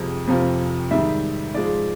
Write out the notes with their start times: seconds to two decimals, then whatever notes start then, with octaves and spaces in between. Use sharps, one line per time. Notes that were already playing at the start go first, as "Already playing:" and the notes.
Already playing: F2 C3 F3 G#3
0.27 F2 C3 F3
0.91 G#2 D#3 G3 E5
1.54 G#2 F3 G#3 D5